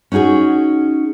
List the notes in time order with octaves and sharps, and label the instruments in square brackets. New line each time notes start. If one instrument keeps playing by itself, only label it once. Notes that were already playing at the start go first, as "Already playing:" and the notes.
[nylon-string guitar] C#4 D#4 F#4 G#4 D#5